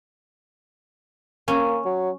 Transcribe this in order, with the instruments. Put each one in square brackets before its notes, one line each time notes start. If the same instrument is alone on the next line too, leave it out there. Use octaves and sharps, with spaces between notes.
[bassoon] A#3 [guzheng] C#4
[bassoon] F#3